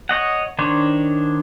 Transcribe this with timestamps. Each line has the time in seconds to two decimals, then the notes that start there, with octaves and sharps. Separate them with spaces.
0.09 C#5 D#5 F#5
0.59 D#3 D4 C5 C#5